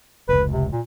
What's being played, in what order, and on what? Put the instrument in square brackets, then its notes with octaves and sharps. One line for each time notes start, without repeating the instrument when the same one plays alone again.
[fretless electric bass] F1 C#2 [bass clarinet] B4
[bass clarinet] C3
A#2